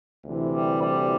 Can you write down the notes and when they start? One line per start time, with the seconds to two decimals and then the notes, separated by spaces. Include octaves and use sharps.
0.24 D2 C3 E3
0.53 G3
0.81 G3